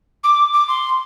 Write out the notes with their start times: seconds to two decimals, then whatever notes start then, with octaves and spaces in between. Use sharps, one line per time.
0.24 D6
0.53 D6
0.68 C6